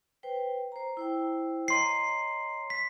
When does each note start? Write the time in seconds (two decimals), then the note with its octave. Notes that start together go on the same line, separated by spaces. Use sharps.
0.23 B4 C5 G5
0.72 C5 A#5
0.97 E4 C5 G5
1.68 C#5 D#5 A#5 C6 C7
2.70 B6